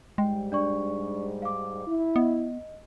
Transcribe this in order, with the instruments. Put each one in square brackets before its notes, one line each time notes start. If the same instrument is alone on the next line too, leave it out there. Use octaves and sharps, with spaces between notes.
[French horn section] G#2 G3 [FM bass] G#3 [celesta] G5
[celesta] D4 D5 C#6
F5 D6
[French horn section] E4
[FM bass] B3 [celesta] D#5